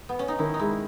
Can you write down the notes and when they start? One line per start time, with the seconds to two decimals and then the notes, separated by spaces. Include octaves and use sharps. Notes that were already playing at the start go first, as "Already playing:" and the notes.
0.09 B3
0.19 C#4
0.28 D#4
0.39 D#3 E4
0.54 D#4
0.59 G#3 E4